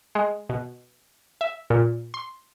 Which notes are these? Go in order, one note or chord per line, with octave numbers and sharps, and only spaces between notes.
G#3
B2
E5
A#2
C6